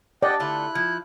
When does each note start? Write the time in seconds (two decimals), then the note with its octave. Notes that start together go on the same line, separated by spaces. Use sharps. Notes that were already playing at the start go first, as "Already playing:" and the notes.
0.23 D4 D5 D#5 F#5 G5
0.40 D3 A3 E4 F4 F#6
0.75 F3 G#6